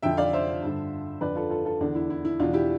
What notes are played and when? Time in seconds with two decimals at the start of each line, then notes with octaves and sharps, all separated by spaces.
0.02 F2 D3 E5 G5
0.17 D5 F5
0.33 C5 E5
0.62 G2 D3
1.21 F2 D3 B4 D5
1.35 F4 A4
1.50 F4 A4
1.65 F4 A4
1.80 E2 D3 D4
1.95 E4
2.10 E4
2.25 E4
2.40 E2 B2 D4 F4
2.53 E4 G4